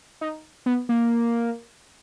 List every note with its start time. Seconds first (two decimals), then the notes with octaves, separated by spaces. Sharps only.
0.21 D#4
0.66 B3
0.89 A#3